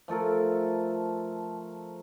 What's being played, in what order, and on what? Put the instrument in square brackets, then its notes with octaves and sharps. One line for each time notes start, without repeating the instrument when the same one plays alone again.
[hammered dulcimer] F3 A3 A4 A#4